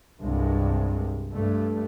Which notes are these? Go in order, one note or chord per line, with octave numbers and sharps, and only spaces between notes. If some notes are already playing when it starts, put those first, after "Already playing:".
C2 G2 C3 G#3
G2 A3